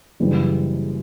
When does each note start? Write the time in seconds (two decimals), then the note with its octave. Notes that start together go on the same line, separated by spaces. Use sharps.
0.20 F#1 F#2 C#3 E3 G3